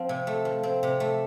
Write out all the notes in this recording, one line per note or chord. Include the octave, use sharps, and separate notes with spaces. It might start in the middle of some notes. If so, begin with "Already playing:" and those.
Already playing: F3 C4
C3
A3
F3
C4
C3
A3